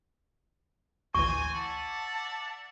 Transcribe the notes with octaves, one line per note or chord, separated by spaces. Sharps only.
A1 D2 E3 C4 G#5 C#6
D5 E5 F#5 A5